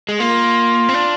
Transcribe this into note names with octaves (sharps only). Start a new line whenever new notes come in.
G#3
A#3 F4
C4
D4